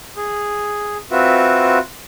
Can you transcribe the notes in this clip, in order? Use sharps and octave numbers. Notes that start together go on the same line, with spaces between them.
G#4
C4 F4 F#4 B4 E5